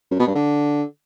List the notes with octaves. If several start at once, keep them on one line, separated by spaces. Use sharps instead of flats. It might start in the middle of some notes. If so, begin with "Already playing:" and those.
F#2
B2
G2
D3